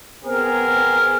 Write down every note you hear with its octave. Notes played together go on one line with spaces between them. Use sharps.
B3 C4 G#4 A#4